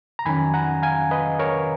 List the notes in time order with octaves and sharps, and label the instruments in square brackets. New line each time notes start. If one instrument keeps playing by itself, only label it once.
[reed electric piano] A#5
F2 D#3 F#3 C#4 G#5 B5
F#5 A#5
F5 G#5
B4 D#5
A#4 C#5